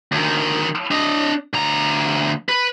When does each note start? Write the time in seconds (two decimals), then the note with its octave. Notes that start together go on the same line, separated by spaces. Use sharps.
0.12 D2 D#3
0.91 D4 D#5
1.54 D2 A#5
2.49 B4